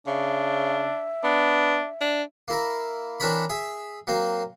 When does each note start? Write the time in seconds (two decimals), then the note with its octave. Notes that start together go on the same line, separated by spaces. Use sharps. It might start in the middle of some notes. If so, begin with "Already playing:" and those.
0.07 C#3 D4 E5
1.24 B3 D4
2.01 D4
2.48 A#3 E4 A#4
3.20 E3 C4 D4 A#4 C#5 B5
3.50 G#4 E5
4.07 F#3 A#3 C4